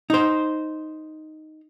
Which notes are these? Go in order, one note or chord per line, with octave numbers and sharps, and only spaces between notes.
D#4 C5